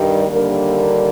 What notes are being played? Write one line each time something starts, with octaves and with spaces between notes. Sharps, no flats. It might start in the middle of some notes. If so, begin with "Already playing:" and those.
Already playing: G2 D#3 G3
D#2 D3 G3 A#3 D4 A#4